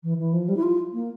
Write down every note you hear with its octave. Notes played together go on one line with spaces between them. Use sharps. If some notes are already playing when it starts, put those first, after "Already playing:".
E3
E3
F3
G3
E4
F4
A#3